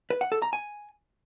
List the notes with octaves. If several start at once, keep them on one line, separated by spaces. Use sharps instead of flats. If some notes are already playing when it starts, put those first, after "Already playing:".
B4
F#5
A4
A#5
G#5